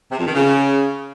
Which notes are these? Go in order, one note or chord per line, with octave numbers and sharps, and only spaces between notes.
C3
F2
D#3
C#3